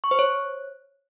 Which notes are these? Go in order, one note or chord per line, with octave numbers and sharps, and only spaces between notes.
C#6
C5
C#5